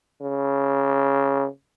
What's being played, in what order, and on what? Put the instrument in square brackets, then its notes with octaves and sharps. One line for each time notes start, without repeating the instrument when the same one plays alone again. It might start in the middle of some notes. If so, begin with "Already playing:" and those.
[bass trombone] C#3